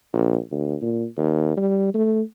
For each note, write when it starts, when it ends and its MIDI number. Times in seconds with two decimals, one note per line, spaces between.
0.13 0.37 34
0.51 0.76 38
0.81 1.05 46
1.17 1.54 39
1.57 1.89 55
1.94 2.22 57